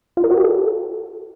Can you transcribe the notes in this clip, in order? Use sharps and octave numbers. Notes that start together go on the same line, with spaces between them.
F4
A#4
F#4
G4
A4